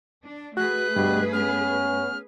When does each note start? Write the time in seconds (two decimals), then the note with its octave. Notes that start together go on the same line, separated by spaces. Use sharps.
0.25 D4
0.57 A3 F#4 G#4 B4 F#6
0.96 D2 G2 B2 G3
1.33 B3 C#4 F6